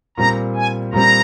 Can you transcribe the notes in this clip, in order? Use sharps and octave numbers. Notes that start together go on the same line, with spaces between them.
A#2 G3 C4 A#5
G#5
A#2 G3 C4 A#5